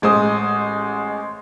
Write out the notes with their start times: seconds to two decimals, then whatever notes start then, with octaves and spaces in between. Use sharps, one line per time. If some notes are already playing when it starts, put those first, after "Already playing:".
0.02 A1 G#3 C5 D#6